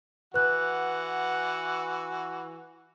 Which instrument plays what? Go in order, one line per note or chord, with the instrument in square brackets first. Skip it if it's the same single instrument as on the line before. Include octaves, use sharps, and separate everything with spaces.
[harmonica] E3 F#4 [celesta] B4 F#6 [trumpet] F#5